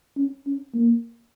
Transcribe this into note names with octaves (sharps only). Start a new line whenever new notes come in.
C#4
C#4
A#3